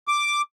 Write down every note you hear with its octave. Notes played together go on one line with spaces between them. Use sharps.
D6